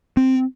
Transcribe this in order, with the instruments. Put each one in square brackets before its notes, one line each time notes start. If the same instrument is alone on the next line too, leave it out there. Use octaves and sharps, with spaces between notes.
[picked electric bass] C4